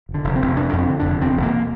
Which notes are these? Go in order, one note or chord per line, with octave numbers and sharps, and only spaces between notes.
F1
D3
F1
C4
F1
F2 D4
F2
C4
D3
D4
F1
E2 C4
E1
A#3